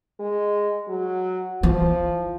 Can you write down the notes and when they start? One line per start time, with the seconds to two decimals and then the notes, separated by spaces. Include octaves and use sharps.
0.20 G#3
0.89 F#3
1.63 E3 F3